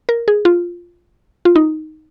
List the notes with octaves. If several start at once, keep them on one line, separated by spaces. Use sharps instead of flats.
A#4
G#4
F4
F4
D#4